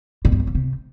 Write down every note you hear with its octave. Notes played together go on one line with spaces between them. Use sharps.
A#2
G2
F#2
C#3
C3